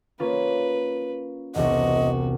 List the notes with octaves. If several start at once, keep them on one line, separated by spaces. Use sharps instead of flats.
A#3 C#4 F4 B4
E1 C2 B3 F#4 D#5